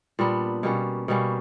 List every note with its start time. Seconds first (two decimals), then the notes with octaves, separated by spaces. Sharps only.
0.19 A#2 G3 B3 D4
0.63 B2 G3 A#3 C#4
1.08 B2 G3 A#3 C#4